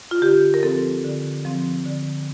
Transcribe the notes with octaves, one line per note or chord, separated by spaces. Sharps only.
F4
D3 G4
A#4
F3 C4 A4
D3
F3 C4
D3